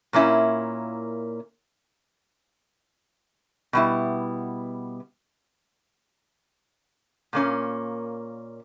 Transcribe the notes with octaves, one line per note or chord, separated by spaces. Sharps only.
A#2 A#3 C#4 E4
B2 G3 B3 E4
A#2 A#3 C#4